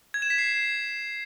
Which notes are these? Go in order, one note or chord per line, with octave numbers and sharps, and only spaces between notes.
G#6
E7
B6
C7